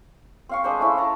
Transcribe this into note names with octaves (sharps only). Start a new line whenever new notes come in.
C4 F5 C#6
G#3 D4 B4 C5
A3 C#4 E4
A5 A#5 C#6